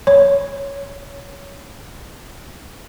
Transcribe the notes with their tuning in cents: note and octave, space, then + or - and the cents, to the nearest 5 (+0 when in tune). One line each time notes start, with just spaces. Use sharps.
C#5 +15